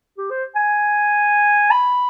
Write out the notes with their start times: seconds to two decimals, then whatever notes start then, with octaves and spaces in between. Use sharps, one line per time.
0.18 G4
0.30 C5
0.56 G#5
1.71 B5